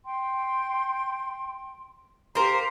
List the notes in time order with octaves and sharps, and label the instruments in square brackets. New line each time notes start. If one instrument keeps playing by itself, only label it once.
[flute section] G5 C6
[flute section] G4 F5 A#5 [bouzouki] A#4 C5